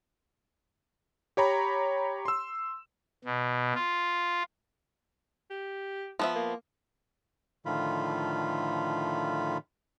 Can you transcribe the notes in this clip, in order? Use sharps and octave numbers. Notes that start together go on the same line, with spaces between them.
G4 C#5 A#5 B5
C6 E6
B2
F4
G4
F3 B3 E5
A#3
A2 D3 D#3 F3 F4 B5